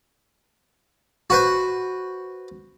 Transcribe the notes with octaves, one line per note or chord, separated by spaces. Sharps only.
F#4 B4 C5